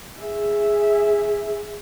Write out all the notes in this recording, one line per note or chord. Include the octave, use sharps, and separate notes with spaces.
G#4 E5